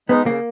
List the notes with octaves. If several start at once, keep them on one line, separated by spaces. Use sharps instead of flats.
G#3 B3 D#4
C#3 A#3